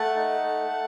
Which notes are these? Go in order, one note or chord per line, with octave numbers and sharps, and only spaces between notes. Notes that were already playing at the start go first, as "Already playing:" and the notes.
Already playing: A3 F#5 A5
D#4
A3
A3